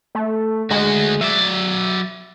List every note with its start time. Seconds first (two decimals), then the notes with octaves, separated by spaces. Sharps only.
0.15 A3
0.70 D2 G#3 F#4
1.21 F#3 D5 E5